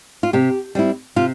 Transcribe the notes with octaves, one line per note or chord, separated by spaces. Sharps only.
F4
C3 G4
G3 C4 E4
C3 F4